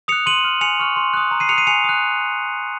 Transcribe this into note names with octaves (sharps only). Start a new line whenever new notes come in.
D#6 F#6 C#7 F7
C6 D#7 F#7
F6
G#5 C#7 F7
C#6 F6
C6
D#6 F#6
A#5
C7 D#7
D#6 F#6 C#7 F7
C7 D#7
G#5 C#7 F7
D#6 F#6